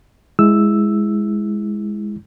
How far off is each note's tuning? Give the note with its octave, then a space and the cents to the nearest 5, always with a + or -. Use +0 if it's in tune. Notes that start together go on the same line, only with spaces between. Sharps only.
G#3 +0 E4 +0 E6 +0